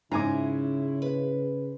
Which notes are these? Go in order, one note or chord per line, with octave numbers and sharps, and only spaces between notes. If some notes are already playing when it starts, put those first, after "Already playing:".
G#2 C#3 C#4 E4 G#5 A#5 D6
B4